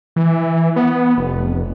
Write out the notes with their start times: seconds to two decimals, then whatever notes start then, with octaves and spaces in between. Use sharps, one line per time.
0.16 E3
0.76 B3
1.18 F1